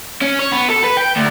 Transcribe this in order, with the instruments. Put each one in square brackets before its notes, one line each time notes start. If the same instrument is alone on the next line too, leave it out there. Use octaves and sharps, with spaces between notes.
[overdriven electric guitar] C#4
C#5
B3
A4
B4
G5
D2